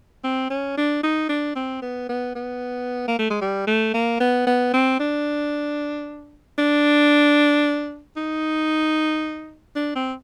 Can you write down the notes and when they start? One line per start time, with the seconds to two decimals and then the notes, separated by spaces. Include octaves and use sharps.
0.24 C4
0.50 C#4
0.77 D4
1.03 D#4
1.29 D4
1.55 C4
1.82 B3
2.09 B3
2.35 B3
3.08 A#3
3.19 A3
3.30 G#3
3.41 G3
3.67 A3
3.94 A#3
4.20 B3
4.47 B3
4.74 C4
5.00 D4
6.58 D4
8.16 D#4
9.76 D4
9.95 C4